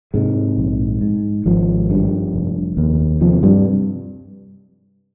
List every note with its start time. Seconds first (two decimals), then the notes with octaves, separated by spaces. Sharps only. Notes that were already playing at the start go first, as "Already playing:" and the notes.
0.14 G#2 C3 G#3
0.58 A#1
1.01 G#2
1.45 G#1 F3
1.90 G2
2.33 F1
2.77 D#2
3.21 C3 F3
3.43 G2 G3